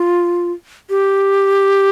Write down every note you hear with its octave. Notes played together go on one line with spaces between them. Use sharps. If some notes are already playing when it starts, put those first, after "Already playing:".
Already playing: F4
G4